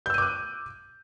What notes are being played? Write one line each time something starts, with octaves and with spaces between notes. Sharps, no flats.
D6 E6 F#6 G6 D#7